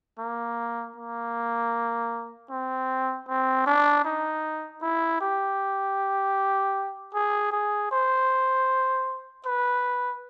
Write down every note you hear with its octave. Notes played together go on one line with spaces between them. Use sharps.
A#3
A#3
C4
C4
D4
D#4
E4
G4
G#4
G#4
C5
B4